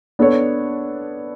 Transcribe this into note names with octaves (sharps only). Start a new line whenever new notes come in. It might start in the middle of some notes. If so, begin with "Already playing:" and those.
B3 D4 A4 C#5